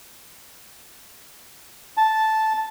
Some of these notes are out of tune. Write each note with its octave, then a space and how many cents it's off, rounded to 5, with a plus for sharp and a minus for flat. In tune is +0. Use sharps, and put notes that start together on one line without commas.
A5 -5